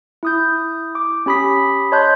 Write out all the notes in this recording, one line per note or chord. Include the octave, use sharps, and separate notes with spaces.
E4 D#6 G6
D6
C#4 G4 B5 D#6 B6
C#5 D#5 A5 C6 F#6 G6